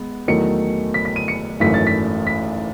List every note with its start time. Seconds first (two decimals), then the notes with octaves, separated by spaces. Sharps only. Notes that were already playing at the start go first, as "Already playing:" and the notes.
Already playing: G#3 B3
0.28 E2 D#3 F#3 A3 C#7
0.94 B6
1.05 B6
1.16 D#7
1.28 C#7
1.60 G#1 F#2 E3 A3 B6
1.74 A6
1.87 B6
2.27 B6